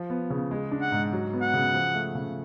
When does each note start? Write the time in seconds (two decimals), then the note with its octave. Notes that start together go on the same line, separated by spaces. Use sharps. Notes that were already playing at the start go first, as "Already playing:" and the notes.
Already playing: F3
0.10 B3
0.30 C#3
0.51 G#3
0.71 D4
0.81 F#5
0.92 G#2
1.13 F#3
1.33 B3
1.43 F#5
1.54 C#3
1.74 F3
1.95 A3
2.15 C#3